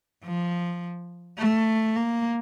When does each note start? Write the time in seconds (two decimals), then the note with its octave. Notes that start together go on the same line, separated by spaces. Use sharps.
0.24 F3
1.39 A3
1.96 A#3